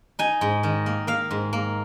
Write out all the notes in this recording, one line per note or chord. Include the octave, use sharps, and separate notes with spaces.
D#4 G#5
G#2
D#3
A#3
A#3 F5
G#2
A#3